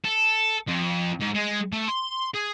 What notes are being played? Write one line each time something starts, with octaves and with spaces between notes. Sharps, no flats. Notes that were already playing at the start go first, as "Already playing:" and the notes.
A4
F2
G#2
G#3
A3
C6
G#4